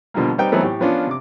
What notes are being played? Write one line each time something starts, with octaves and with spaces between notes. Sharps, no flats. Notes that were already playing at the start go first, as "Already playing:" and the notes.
B2 D3 F3 G3 A#3
G3 C4 D#4 B4 G5
E3 F#3 A3 B3 C4 D#4
A2 G4
F3 B3 C#4 D4 F4
C3 D6